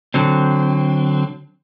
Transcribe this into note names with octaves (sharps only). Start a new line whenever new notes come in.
D3 F#3 C4